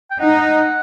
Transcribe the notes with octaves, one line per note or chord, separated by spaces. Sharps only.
G5
D#4 F#5